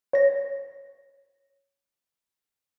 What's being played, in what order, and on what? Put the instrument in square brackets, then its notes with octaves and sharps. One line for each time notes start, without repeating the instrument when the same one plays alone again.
[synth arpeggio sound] C#5 A#6